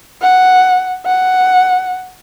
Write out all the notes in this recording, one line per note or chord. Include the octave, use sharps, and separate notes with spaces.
F#5
F#5